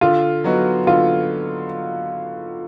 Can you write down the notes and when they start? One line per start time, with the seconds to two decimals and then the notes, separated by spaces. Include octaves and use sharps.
0.01 D3 F4
0.44 F#3 B3 D#4 F#4
0.87 D3 F4